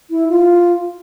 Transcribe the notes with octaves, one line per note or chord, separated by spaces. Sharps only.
E4
F4